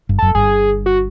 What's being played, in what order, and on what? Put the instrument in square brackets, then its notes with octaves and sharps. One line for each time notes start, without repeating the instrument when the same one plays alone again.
[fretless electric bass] G1 G2
[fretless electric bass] F#1 F#2 [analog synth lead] A4
[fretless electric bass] G1 G2 [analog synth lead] G#4
[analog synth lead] F#4